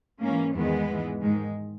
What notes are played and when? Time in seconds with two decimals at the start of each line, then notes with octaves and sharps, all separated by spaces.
0.22 G#2 E3 A#3 C#4
0.55 E2 D#3 G#3 B3
0.88 G#2 E3
1.21 G#2 D#3 G#3